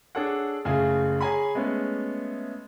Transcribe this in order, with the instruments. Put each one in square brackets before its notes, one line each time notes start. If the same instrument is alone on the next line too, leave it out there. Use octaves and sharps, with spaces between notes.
[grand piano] D4 G#4 A4 C#5 F#5
F#1 C#3 A3 F4 G#4 G#5
G#4 C#5 G#5 A#5 B5
G#3 A3 B3 C#4